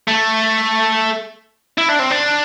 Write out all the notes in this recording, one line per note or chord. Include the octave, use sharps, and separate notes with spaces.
A3
E4
D4
C4
D4